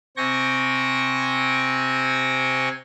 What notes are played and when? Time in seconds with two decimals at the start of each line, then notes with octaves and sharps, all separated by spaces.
0.17 C3 C4 G5 G#5 C#6 A#6